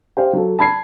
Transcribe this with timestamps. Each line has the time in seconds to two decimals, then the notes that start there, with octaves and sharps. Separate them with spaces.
0.17 G4 C5 F5
0.33 F#3 A4
0.59 A5 B5 G#6 C7